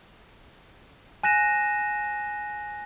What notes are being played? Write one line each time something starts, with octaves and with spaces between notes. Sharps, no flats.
G#5 F#6 A#6 D#7 E7